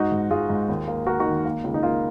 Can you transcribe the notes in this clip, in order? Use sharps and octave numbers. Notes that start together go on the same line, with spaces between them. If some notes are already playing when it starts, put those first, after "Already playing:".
Already playing: G#2 D#4 F#4
G#2
G#2 F4 G#4
G#2
D#2
A#3
A#3 F#4 A#4
D#4 F#4
D#3
A#3
C#2
D#4
A#3 F4